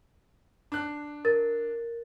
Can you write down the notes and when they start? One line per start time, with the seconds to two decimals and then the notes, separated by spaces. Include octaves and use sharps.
0.72 D4 F#6
1.25 A#4 A6